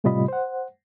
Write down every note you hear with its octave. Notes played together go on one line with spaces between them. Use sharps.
A2 C3 G3 F4 D#5 B5
C5 F#5